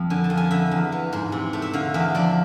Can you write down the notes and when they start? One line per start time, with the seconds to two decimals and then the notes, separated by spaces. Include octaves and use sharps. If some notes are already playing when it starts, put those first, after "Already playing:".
Already playing: F2 F5
0.10 D3 G#5
0.24 A5
0.30 F2
0.37 G#5
0.51 D3 E5
0.71 E2
0.92 E3
1.13 G#2
1.32 C3
1.53 A3
1.62 E5
1.73 D3 F5
1.94 E2 E5
2.15 F3 D5